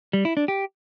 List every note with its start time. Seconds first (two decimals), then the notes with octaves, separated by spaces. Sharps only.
0.13 G3
0.25 E4
0.37 D4
0.48 G4